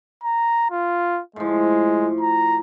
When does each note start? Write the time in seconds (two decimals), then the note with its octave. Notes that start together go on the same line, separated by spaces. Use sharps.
0.24 A#5
0.71 F4
1.36 A2 F3 G#3
2.21 A#5